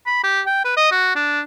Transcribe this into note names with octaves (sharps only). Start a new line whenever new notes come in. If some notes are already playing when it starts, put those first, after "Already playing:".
B5
G4
G5
B4
D#5
F#4
D4